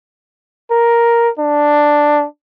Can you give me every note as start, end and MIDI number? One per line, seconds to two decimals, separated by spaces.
0.71 1.29 70
1.39 2.25 62